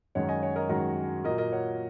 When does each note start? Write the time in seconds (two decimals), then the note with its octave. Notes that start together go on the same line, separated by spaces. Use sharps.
0.15 F#2 D#3 G#3 C#5 F#5
0.28 D#5 G#5
0.42 C#5 F#5
0.56 A#4 D#5
0.69 F#2 D#3 G#3 F#4 A#4
1.24 A#2 A#4 D#5
1.29 F#3
1.38 A#4 D#5
1.52 C#5 F#5